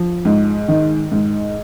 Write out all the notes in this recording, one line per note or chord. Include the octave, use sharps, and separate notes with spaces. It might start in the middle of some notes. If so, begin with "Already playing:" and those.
Already playing: F3
G#2
D#3
G#2